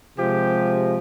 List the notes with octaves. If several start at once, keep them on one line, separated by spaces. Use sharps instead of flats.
C3 F3 G#3 G4